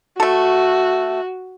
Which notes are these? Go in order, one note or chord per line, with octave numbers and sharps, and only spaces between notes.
A3 F#4 A4